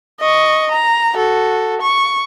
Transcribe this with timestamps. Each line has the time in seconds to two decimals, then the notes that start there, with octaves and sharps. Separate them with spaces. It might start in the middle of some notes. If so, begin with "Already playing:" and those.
0.20 D#5 C#6
0.71 A#5
1.15 F#4 A4
1.82 C#6